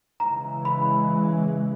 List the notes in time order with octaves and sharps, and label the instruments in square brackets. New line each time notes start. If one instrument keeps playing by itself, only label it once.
[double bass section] C#3 E3 G#3 [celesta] A#5
[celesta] B5